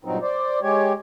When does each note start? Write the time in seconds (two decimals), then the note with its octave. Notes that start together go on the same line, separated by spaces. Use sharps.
0.05 G2 A#2 F#3 C4 D#4
0.22 C5 D5
0.62 G#3 G4 C#5